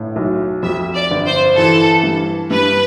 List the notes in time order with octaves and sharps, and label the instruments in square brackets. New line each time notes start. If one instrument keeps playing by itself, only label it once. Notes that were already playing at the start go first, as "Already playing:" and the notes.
Already playing: [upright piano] G1 A2
B1
[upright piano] F2 [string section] E5
[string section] D5
[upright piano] G1
[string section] C5
[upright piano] E3 [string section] A4
[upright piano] G2
[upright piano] G2 [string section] B4